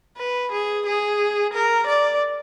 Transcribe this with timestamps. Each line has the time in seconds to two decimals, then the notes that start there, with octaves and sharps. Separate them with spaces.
0.18 B4
0.52 G#4
0.86 G#4
1.53 A#4
1.87 D5